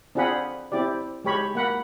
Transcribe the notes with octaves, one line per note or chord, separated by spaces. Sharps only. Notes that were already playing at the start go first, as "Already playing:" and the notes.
C4 D4 F4 G#4 F#5 B5
C4 E4 G4 D5
G#3 G4 C#5 B5
A#3 F#5 B5